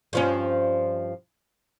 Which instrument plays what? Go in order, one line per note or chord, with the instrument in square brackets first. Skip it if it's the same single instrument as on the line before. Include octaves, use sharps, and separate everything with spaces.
[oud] G2 F3 C#4